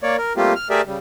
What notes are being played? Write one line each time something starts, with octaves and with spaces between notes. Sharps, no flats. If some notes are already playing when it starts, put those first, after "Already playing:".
A#3 C#5 D5
A#4
G3 A3 A#3 C4 F4 G4
F6
A3 G4 G#4 A#4 D5 E5
C#3 G3